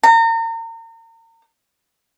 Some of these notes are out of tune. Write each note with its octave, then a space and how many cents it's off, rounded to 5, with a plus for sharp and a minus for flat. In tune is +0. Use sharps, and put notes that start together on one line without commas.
A#5 -35